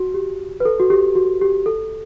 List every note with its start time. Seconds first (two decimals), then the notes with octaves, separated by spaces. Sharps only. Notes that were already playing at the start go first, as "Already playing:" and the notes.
Already playing: F#4
0.14 G4
0.60 B4
0.65 A4
0.80 F#4
0.90 G4
1.15 F#4
1.41 G4
1.66 A4